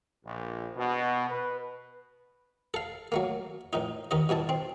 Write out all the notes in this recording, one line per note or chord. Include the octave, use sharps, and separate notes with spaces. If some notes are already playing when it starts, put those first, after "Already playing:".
A#1
B2
B4
A4 F5
F#3 A3 A#3
A#1 A2 D#4
D#2 D#4 D#5
G2 B2 E4 A5
C4